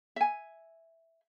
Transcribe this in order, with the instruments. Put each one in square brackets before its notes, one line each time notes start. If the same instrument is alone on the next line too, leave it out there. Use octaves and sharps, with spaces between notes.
[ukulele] E5 G#5